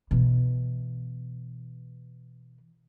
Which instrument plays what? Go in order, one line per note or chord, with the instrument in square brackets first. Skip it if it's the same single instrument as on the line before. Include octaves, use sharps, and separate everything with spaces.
[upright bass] B2 E3